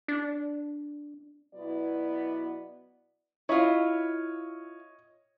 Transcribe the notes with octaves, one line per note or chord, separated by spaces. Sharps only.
D4
B2 F#3 B3 E4 D5
E4 F4 C#5 D#5